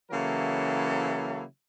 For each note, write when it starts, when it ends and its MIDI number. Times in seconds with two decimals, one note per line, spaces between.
0.12 1.44 49
0.12 1.44 52
0.12 1.44 54
0.12 1.44 58
0.12 1.44 64
0.12 1.44 69